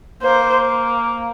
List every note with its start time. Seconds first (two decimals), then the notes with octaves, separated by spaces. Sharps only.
0.22 A#3 C5